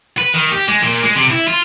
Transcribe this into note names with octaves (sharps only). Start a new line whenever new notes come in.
B4
D#3
G4
G#3
A#2
G#3
C3
E4
F4